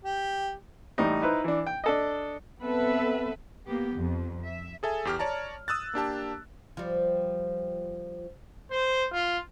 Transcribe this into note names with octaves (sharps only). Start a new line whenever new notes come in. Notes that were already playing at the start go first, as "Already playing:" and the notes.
G4
A2 E3 G3 D#4
D#4 E4 B4 C5
E3 D4
G5
D4 A4 D#5
B3 C4 A4 B4 E5
A#3 B3 G4
F2
E5
G#4 A4 E5 G#5
E2 G4 F6
C#5 D5 A5 A#5
D#6 E6 F#6 A6
A#3 D4 G4 A5
F3 G3
C5
F4